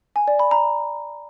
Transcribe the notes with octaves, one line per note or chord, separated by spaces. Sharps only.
G#5
D5
B5
A#5